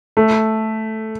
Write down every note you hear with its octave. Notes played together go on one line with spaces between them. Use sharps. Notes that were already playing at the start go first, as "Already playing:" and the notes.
A3